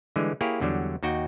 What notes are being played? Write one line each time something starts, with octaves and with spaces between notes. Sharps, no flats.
D3 E3 G3 G#3
A#3 E4 G4 G#4 C#5
E2 D3 F#3 G3
D#2 D#4 F#4 G5